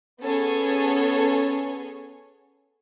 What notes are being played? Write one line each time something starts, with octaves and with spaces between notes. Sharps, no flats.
B3 C#4 G#4 A4 C#5